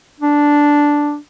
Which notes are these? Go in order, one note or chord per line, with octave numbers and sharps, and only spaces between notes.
D4